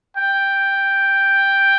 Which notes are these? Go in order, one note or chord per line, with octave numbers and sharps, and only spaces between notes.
G5